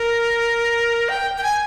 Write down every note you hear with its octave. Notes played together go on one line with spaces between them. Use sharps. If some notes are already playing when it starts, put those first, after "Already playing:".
Already playing: A#4
G5
G5
G#5